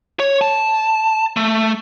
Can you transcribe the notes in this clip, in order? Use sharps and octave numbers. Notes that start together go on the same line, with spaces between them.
C#5
A5
A3